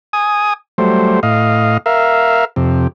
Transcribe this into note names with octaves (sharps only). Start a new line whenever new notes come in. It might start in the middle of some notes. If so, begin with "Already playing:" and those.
G#5 D#6
F#3 G3 A3 C5
A2 D#5 F5
A#4 E5 F5
F2 C3